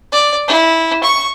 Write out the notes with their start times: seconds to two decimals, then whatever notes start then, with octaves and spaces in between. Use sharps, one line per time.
0.12 D5
0.48 E4
1.03 C#6